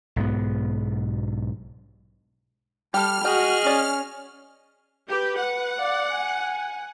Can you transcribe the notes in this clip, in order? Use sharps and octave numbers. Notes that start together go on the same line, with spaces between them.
B1 G#2 B3
G3 G4 A4 F6
F#4 G#4 D#5 G5
C#4 D5
G4 B4
F#5
D5 F5
G#5